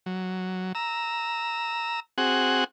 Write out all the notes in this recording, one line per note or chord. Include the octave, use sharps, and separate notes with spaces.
F#3
A#5 E6
C4 F#4 G#4 F#5